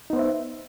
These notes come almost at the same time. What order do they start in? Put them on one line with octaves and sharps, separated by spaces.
D#4 B3 C5 E5